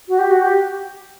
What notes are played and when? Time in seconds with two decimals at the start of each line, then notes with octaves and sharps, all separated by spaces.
0.08 F#4
0.19 G4
0.30 F#4
0.42 G4